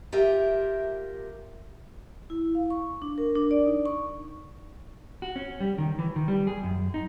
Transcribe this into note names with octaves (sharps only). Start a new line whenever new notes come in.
F4 G4 A#4 E5
E4
F5
C#6
D4
A#4
D4
D5
D#4
C#6
F#4
C#4
G3
D#3
E3
D#3
G3
G#4
F#2
D#4